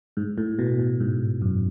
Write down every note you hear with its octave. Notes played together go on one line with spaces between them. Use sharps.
G#2
A2
B2
A2
G#2
F#2